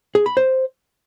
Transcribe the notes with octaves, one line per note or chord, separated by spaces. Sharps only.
G#4
B5
C5